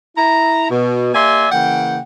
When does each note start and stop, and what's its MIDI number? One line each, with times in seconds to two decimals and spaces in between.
0.17 0.67 64
0.17 0.67 82
0.70 1.11 47
1.14 1.47 58
1.14 1.47 67
1.14 1.47 74
1.14 1.47 76
1.14 1.47 80
1.14 1.47 84
1.52 1.99 49
1.52 1.99 52
1.52 1.99 58
1.52 1.99 78
1.52 1.99 79